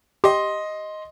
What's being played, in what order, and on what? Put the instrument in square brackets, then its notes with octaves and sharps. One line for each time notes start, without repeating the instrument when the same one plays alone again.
[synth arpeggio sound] G4 [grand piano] D#5 C6